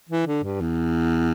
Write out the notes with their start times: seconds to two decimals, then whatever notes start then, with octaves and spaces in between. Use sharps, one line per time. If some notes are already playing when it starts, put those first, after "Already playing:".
0.09 E3
0.27 D3
0.44 G2
0.61 E2